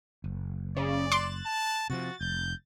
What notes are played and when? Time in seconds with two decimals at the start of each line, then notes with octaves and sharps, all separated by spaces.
0.24 F#1
0.77 C#3 D5
1.12 C6 D6 F#6 A6 E7
1.46 A5
1.90 C3 E3 F3 F#4 A6
2.21 F1 G6